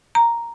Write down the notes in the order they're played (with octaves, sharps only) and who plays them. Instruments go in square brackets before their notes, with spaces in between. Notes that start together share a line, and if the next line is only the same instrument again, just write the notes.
[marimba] A#5